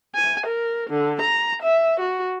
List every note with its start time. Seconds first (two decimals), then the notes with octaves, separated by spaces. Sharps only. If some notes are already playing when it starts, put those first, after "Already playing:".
0.15 G#5
0.46 A#4
0.90 D3
1.21 A#5
1.62 E5
2.00 F#4